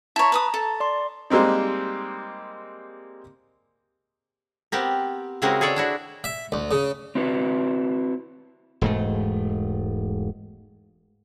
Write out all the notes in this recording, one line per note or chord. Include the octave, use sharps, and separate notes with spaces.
E4 C#5 A5 A#5
B4 C#6 D#6
A4
D5 C6
G3 G#3 A#3 C4 D#4
B3 C4 G4 A#4
C#3 G#3 C4 E4 F#4 A#4
G#4 A4 C#5 D5
D4 E4 F#4
E5
D2
C#3
C4 E4 F#4 B4 C5
E1 G#2 A3